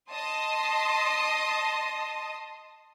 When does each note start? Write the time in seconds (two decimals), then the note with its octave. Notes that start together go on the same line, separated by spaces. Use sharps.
0.12 D#5 A5 C6 D#6